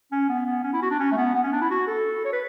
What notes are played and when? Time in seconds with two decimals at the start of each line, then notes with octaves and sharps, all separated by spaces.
0.12 C#4
0.29 B3
0.46 B3
0.64 C#4
0.73 E4
0.82 F#4
0.91 D4
0.99 C#4
1.12 A3
1.17 B3
1.35 B3
1.44 C#4
1.52 D4
1.62 E4
1.71 F#4
1.87 A4
2.25 C#5
2.33 B4